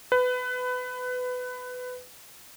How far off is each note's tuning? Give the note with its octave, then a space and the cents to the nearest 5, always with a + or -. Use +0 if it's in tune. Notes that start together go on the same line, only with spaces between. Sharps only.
B4 +20